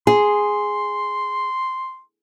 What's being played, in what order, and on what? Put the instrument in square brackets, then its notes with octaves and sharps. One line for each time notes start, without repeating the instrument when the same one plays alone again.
[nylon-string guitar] G#4 [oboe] C6